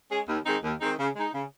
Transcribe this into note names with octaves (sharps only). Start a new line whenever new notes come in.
G#3 C#4 G#4
D#2
D#3 G#3 C4 D#4
D#2
D#3 G#3 C4 D#4
C#3
G#3 D#4
C#3